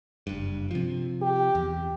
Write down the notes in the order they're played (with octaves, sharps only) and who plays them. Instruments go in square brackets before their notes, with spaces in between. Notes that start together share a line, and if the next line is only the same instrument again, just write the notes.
[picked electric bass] F#1 G2
C3 F3
[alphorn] G4
[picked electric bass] E2